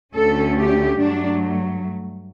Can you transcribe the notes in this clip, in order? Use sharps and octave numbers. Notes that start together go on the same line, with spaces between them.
D2 D3 A3 C#4 A4
G4
G2 F#3 A3 D4